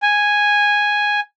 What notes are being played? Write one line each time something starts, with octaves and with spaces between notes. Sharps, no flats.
G#5